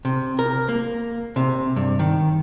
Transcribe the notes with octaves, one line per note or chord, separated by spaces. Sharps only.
C3
A#4
A#3
C3
G2
D#3